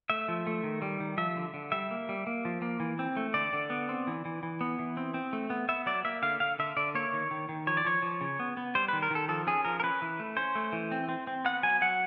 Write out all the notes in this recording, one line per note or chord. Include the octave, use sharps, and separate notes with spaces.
A3 E5
F3
A3
D#3
G3
D#3
F3 E5
D3
D3
G3 E5
A#3
G3
A#3
F3
A#3
E3
C4
A3
D3 D5
D3
B3
C4
E3
E3
E3
B3
E3
C4
C4
A3
B3
B3 E5
F#3 D5
A#3 E5
D3 F5
D3 F5
D3 E5
D3 D5
A#3 C#5
D#3
D#3
D#3
F3 C#5
D5
F3 C#5
F3
C#3
B3
B3
G3 C5
B4
D#3
A#4
D#3 A4
F3 A4
C#4 G#4
F3 A#4
A#4
C#4 B4
E3
A3
C#4 C5
A3
E3
C4
C4
C4
B3 F#5
F#3 G#5
F#3 F#5